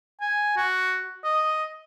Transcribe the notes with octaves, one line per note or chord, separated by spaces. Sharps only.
G#5
F#4
D#5